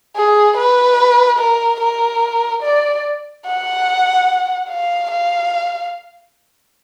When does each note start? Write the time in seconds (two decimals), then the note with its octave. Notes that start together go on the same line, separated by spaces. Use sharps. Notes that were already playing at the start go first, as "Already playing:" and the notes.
0.16 G#4
0.57 B4
1.39 A#4
1.80 A#4
2.63 D5
3.46 F#5
4.70 F5
5.11 F5